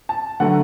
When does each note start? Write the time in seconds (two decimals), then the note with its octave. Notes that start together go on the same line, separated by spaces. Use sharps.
0.09 A5
0.40 D3 F#3 A3 F#5